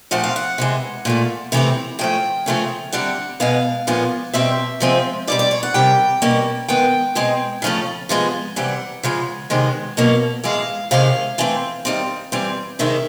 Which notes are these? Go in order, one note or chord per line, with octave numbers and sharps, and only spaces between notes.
A#2 F3 A3 C4 F#5
F5
F#5
C3 E3 G#3
A#2 F3 A3
C3 E3 A3 C4
C#3 F3 A3 G5
C#3 F3 A3 C#4
D3 G3 C4 F#5
B2 G#3 B3 F5
A#2 F3 G#3 B3
B2 G3 C4 E5
C3 F3 G#3 C4
B2 G3 C4 D5
D5
C#5
F#5
C3 D#3 G3 G5
B2 G3 A#3 C#4
D#3 G#3 B3 G5
B2 G#3 C4
C#3 F3 A3 C#4
C3 F3 G#3 B3
C3 E3 G3 F#5
C#3 F3 G#3
C3 D#3 G#3 B3
B2 F#3 A#3 C#4
A2 E3 G#3 F5
C3 D#3 G#3 C#4 F5
E3 A3 C4
D#3 G3 C4
E3 G3 C4
C3 D#3 G#3 C#4 E5